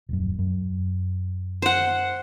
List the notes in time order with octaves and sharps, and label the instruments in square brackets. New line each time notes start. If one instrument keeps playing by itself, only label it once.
[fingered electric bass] D#1 F#2
F#2
[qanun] C5 F#5